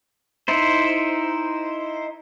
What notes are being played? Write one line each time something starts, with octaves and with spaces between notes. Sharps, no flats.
D#4 E4 C5